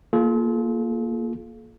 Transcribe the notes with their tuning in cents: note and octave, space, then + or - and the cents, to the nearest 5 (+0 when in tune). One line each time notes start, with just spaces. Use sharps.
A#3 +0 F4 +0 A4 -45